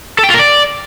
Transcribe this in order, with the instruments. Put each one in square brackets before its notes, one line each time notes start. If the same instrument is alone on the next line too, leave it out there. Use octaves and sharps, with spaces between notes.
[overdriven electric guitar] A4
G5
F4
A#4
D5